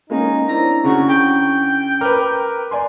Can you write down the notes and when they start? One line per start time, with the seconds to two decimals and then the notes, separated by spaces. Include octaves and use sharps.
0.10 G#3 A#3 C#4 D#4
0.48 C4 D4 E4 A#5
0.84 C#3 F#4 G#4
1.09 G5
2.01 A#4 B4 D6
2.71 D5 G#5 C6